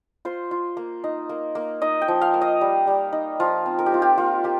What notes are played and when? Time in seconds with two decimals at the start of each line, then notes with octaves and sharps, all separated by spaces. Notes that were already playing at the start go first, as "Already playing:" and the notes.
0.25 F4 C5
0.51 F4
0.77 A#3
1.04 D#4
1.29 A#3
1.55 A#3
1.82 D#4 D#5
2.02 G5
2.08 F3
2.21 F5
2.34 A#3
2.42 D#5
2.61 G3
2.87 G3
3.13 D#4
3.40 F3 F4
3.66 C4
3.79 A#4
3.86 G4
3.92 C4 F4
4.02 G4
4.18 A#3 F4
4.44 A#3 G4